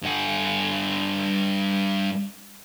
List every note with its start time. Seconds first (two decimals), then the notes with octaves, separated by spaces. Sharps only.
0.02 G2 F#5